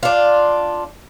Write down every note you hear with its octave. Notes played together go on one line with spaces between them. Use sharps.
D4 F4